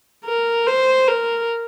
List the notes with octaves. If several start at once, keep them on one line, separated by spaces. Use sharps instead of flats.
A#4
C5
A#4